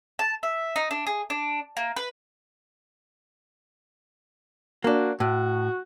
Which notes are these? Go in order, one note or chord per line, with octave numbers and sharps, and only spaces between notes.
A5
E5
D#4
D4
G#4
D4
A#3
B4
A#3 D4 F#4
A2 F#4